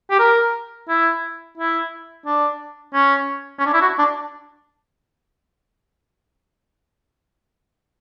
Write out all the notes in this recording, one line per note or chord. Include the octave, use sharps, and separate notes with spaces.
G4
A#4
E4
E4
D4
C#4
C#4
D4
E4
F#4
D4